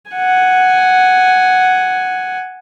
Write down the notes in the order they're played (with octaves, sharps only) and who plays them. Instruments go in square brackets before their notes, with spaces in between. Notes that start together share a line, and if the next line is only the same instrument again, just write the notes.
[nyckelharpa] F#5 G#5